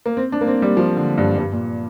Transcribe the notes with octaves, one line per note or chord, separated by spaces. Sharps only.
A#3
C4
D4
A#3
C4
G3
F3
D3
G2
G2
A#2